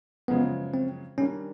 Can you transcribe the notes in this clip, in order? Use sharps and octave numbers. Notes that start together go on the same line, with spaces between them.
F#2 C#3 F3 G#3 B3
C4
D#3 G3 A#3 C#4 D4